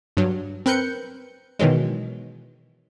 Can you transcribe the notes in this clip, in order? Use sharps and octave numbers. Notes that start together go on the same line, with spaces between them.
G2 F#3
C4 A#4 B4 F#6 G6 C#7
B2 D#3 E3 F#3 G#3